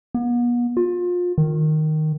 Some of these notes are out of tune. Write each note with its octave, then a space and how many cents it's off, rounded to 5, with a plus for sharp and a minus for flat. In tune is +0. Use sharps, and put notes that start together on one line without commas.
B3 -40
F4 +30
D#3 -5